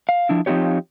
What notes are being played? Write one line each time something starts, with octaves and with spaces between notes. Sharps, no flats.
F5
F3 D4 E4
F3 C4 D#4 F4 G4 C#5